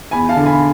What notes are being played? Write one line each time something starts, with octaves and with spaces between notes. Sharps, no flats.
E2 G#5 B5
F5 A5
D3
G#5 B5